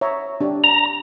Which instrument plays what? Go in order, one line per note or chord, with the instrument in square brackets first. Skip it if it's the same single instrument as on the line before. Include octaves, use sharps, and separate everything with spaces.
[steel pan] C#5 E5 A#5
D4 G4
[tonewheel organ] A#5